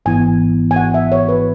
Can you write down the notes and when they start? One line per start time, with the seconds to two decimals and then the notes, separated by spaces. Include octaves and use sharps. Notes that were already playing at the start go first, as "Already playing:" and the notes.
0.05 G#1 G#2 E3 B3 E4 G#5
0.71 G#5
0.76 F#5
0.94 E5
1.12 C#5
1.29 B4